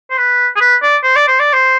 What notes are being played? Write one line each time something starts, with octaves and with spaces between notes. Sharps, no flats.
C5
B4
G#4
B4
D5
C5
D5
C5
D5
C5